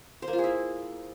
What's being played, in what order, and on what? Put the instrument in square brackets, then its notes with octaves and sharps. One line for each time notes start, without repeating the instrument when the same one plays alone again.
[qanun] C5
A#3
F4
G#4
E4